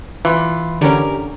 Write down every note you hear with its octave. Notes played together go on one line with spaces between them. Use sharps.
E3 F4
D3 C#4 G4 A#4